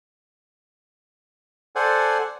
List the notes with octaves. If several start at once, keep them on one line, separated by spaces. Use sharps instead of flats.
A4 C5 D5 F#5 G#5